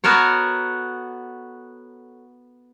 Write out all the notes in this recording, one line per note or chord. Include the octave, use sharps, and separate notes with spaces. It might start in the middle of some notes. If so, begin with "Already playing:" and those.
B3 F#4 A4 A#4 C#5